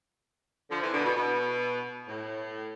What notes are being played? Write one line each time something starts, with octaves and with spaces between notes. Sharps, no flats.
D3 F3
C3 E3
B2 D3
B2
B2
A2